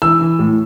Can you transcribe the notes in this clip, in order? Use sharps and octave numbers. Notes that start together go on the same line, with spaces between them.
E3 E6
E3
A2